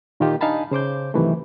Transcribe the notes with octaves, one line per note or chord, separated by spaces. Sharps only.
A#2 D#3 A#3 D#4 F4 G4
D4 D#4 F5 G#5 A5 B5
C#3 C5 D6 G6
G2 C3 D#3 E3 F#3 A3